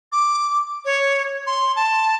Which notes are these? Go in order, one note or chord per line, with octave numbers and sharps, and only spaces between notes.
D6
C#5
C6
A5